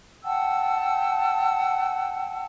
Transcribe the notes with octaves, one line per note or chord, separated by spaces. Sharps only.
F#5 G5 A5 E6